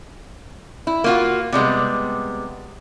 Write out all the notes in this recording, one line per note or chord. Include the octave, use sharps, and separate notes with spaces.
E4
A#3 F4 F#4
C3 G3 G#3 B3